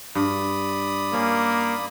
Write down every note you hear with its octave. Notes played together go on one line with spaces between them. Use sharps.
G2 D5 B5 D#6
A#3 C#4